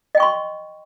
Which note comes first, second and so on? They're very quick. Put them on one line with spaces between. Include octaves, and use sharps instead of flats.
D#5 G5 C#6 C6